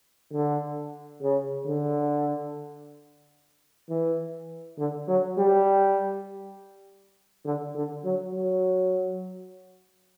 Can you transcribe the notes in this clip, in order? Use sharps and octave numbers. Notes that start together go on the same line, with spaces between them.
D3
C#3
D3
E3
D3
F#3
G3
D3
D3
F#3
F#3